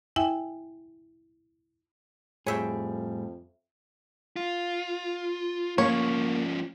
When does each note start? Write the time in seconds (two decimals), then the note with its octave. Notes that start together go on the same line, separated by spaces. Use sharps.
0.16 E4 E5 G5 G#5
2.47 F2 A2 G3 G#4 C#5 E5 G5
4.36 F4
5.78 F3 A#3 C#4 C#5